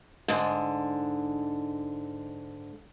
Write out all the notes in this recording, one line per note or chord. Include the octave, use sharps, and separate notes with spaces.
G#2 D3